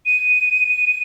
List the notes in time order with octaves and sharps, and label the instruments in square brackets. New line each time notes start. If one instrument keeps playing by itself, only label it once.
[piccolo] D#7